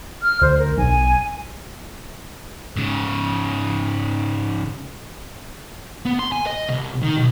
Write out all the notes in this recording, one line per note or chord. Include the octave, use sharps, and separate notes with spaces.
F6
D2 C5
A#4
B1 G#5
G#2 C#3
B3
C6
G#5
D#5
C2
D#3
B1